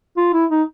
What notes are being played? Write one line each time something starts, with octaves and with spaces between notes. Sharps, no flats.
F4
E4
D#4